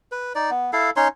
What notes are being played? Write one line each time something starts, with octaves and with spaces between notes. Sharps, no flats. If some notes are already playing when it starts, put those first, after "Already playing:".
B4
D#4 D5
B3
E4 A4 F5
C#4 D#4 C#5 C6